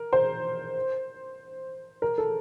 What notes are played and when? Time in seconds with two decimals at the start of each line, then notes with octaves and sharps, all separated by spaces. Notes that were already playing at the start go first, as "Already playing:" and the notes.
Already playing: A#4
0.13 C5
2.02 A#4
2.18 A4